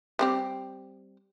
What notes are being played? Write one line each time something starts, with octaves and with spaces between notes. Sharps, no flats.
G3 C4 G4